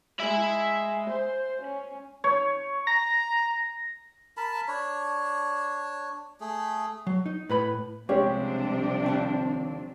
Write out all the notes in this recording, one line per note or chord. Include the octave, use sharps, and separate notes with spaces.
G#3 E5 B5
C5
C#4
C#5
A#5 A#6
A#4 A5 B5
D4 C#5
A3 G#4
F#3
D#4
A2 B4 B5
C2 C3 F3 G#3 C#4 D4 G4
D#2 C4 A5